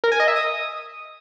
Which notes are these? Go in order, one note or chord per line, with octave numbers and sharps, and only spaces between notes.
A#4
G#5
D#5
E5
D#6